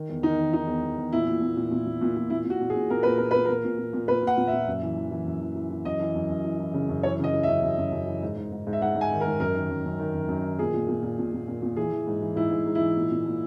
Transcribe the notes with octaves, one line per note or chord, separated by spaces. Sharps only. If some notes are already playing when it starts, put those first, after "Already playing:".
Already playing: D#3
E2
D#3 D#4
D#3
D#3 D#4
E2
E2
E2
A#2 E4
A#2
A#2
A#2
A#2
A#2
A#2
A#2
A#2 E4
A#2
F#4
A#2
G#4
A#2
A#2 A#4
A#2 B4
A#2 A#4
A#2 B4
A#2 A#4
A#2
A#2
A#2
A#2 B4
A#2
F#5
A#2
E5
A#2
F#2
E3
E3
E3
F#2
E3
E3
E3
F#2 D#5
E3
F#2
F#2
E3
E3
C#3
F#2
E3 C#5
C#3 D#5
E3
F#2 E5
F#2
F#2
F#2
E3
G#2
G#2
G#2
G#2
E5
G#2 F#5
G#2
G#5
D#3
A#4
G#2
F#2 A#4
D#3
F#2
F#2
D#3
F#2
F#2
D#3
A#2 G#4
A#2
A#2
A#2
A#2
A#2
A#2
A#2
E3 G#4
E3
G#2
E3
G#2 E4
G#2
G#2
E4
E3
A#2
A#2
A#2